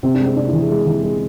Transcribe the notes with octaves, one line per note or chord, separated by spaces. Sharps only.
C3 C4
D4
G#3
C4
C3 D4
E4
E3
G#4
G#3
E3
G#3